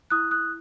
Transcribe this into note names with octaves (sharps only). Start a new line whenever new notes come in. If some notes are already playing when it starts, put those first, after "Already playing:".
E4 D#6 F#6
D#6 F#6